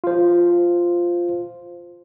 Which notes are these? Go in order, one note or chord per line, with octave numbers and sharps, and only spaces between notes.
F4 C5